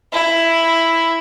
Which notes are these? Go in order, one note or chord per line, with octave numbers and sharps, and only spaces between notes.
E4